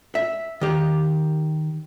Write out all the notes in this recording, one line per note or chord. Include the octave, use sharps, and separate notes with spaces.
E5
D#3 G4